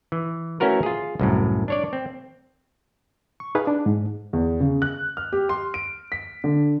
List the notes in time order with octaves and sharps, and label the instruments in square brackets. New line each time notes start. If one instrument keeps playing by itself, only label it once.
[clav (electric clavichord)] E3
A3 C#4 E4 F#4 A#4 B4
F4 G#4
C2 F#2 A2
D4 C#5 D5
C4
[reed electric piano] C#6
D#4 G#4 B4 F5
D4
G#2
[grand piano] E2
C#3
F#6
F6
G4
C6
D7
B6
D3